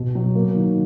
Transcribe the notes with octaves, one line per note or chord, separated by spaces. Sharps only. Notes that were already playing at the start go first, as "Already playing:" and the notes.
Already playing: B2
F#3
A#3
D#3